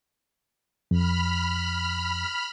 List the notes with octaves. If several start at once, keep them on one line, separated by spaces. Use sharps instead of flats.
F2 B5 F6